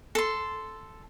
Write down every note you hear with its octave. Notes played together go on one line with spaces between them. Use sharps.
A4 C6